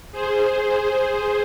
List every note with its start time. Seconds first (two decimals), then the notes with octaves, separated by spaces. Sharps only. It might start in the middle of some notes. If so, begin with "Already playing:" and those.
0.12 G#4 C5